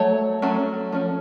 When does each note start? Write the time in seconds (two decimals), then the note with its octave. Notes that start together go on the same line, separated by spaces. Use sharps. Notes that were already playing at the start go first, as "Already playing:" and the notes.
Already playing: F#3 A3 C#5
0.42 F#3 A3 C#4
0.92 F3 A3 C#4